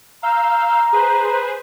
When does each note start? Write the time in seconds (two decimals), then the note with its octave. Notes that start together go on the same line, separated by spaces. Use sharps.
0.23 F5 A#5 E6 G6
0.93 G#4 B4 C5